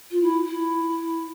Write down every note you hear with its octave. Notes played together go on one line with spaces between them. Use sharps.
F4
E4
E4